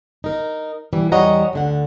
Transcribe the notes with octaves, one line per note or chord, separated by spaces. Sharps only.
D#4 A#4
B2 E3 G3
E2 G3 C#5 D#5 F#5 A#5
D2 D3 F#5